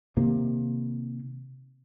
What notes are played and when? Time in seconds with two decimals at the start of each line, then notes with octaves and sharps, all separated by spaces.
0.17 C3 D#3 A#3